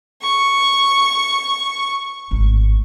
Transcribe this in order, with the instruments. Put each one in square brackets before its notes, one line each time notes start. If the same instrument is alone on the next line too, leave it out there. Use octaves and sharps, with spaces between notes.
[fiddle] C#6
[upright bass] G#1 A2